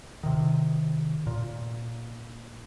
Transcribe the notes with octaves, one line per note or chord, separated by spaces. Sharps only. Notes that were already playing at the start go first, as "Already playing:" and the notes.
C3 D#3
A#2